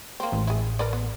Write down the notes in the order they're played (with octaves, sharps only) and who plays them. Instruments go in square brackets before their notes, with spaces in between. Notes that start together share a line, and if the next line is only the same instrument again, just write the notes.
[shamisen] A#3 C4
[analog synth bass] A1
[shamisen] E4 G#4
A#4 B4 D5
B3